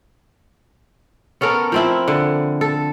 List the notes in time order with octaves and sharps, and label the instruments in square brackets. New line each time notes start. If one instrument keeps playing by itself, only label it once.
[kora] B3 C#4 A4 A#4
F3 C4 E4
D3
A4